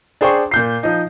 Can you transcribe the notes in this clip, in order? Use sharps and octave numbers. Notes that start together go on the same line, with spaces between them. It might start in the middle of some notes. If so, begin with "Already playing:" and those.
D4 G#4 C5 G5 C#6
A#2 G6 C7
F3 D#4